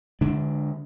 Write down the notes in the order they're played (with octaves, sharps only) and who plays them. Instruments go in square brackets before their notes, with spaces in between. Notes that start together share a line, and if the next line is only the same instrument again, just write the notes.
[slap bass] D3 G#3 D4